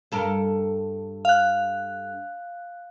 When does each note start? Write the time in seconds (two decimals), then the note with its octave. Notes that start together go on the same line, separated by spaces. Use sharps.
0.12 G2 A4 A#4
1.25 F5 F#6